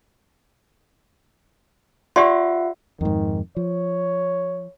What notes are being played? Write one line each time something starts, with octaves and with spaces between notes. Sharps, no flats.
F4 G4 D5 E5 F#5 C6
F2 G#2 D#3
F3 C#5